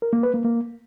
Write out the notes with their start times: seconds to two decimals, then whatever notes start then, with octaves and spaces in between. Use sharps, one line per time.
0.02 A#4
0.13 A#3
0.23 B4
0.34 A#3
0.44 A#3